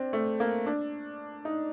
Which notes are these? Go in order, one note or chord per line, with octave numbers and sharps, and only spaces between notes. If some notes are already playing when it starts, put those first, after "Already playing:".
Already playing: C4 D4
A3
A#3
D4
D#4